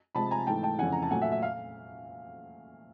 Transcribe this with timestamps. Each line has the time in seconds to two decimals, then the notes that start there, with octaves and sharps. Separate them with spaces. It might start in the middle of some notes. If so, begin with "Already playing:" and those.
0.15 C3 F3 G#3 A5 B5
0.31 G#5 A#5
0.47 G#2 E3 A3 G5 A5
0.63 G5 A5
0.78 F2 C#3 E3 F#5 G#5
0.92 A#5
1.02 A5
1.11 A#2 F#3 A3 F#5 G#5
1.22 E5 F#5
1.32 E5
1.42 F5